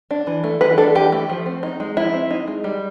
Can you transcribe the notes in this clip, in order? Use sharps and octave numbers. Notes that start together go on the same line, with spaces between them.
D4
E3
A3
E3 B4
D4 A4
E3 G4
A3
F3
C4
D#4
G#3
F3 E4
C4
D#4
G#3
G3